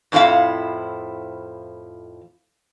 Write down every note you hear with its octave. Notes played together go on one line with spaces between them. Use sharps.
F2 A2 F3 E4 F5